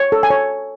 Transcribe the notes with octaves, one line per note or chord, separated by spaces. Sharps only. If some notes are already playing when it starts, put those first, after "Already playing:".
Already playing: C#5
A4
G#5
C#5